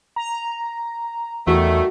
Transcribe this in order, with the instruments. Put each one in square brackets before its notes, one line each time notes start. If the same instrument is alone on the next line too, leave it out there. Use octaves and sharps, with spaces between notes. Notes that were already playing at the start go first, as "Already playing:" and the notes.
[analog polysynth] A#5
[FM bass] E2 [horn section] D#3 G3 A3 [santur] F#4